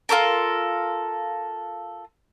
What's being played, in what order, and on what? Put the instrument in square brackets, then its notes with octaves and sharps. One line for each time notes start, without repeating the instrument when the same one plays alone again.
[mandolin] F4 G4 A4 A#4